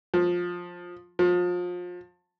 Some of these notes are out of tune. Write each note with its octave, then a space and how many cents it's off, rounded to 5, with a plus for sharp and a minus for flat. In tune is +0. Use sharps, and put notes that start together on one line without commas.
F3 +15
F3 +30